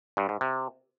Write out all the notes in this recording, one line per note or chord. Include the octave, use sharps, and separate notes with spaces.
G2
G#2
C3